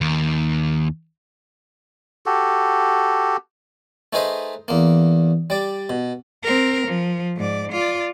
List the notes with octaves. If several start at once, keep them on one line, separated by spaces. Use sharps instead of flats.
D#2
F#4 G4 A4
A3 D#4 G#4 B4 C5 D#5
E2 A#3
G3 D5
B2
C4 A#4
F3
G#2 D5
F4 D5